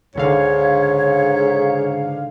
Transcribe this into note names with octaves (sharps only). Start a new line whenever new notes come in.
C#2 G#2 D3 C#5 F5